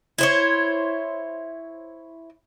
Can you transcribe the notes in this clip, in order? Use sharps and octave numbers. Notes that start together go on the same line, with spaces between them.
E4 C5 C#5